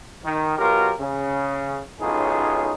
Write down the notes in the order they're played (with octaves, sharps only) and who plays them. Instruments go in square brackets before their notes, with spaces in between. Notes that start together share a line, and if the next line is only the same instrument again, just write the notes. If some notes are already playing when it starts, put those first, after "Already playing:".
[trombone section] D#3
B2 F#3 F4 G4 A#4
C#3
B1 A2 C#4 D#4 F4 G#4